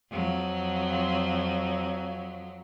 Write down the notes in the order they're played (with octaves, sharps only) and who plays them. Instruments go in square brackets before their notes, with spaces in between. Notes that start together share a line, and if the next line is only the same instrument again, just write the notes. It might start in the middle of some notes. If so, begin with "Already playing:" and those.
[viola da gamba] F2 F#3